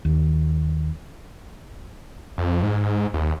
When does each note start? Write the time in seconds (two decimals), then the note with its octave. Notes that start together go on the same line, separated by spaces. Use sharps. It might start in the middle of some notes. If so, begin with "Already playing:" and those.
0.05 D#2
2.38 F2
2.63 G#2
3.14 D#2